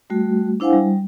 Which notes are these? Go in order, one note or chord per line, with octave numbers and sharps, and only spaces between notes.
G3 A3 F#4
D4 E4 C5 F5 F#5 G#5
G3